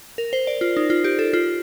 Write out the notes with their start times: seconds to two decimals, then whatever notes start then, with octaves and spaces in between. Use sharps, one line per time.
0.18 A#4
0.33 C5
0.47 D5
0.61 F4
0.77 D#4
0.90 F4
1.04 G4
1.19 A4
1.33 F4